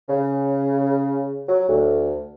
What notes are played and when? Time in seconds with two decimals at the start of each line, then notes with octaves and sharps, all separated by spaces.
0.09 C#3
1.49 F#3
1.68 D2